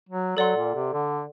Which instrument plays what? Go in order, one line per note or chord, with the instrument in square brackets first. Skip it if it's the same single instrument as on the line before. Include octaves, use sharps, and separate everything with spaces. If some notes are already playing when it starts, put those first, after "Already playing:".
[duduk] F#3
[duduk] F#3 [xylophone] A4 D5 F#5 C6
[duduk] A#2
C3
D3